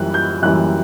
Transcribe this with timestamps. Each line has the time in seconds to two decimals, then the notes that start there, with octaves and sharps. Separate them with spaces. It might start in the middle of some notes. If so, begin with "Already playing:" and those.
Already playing: F#2 E3 G3 F#6
0.14 G6
0.42 F#2 E3 G3 F#6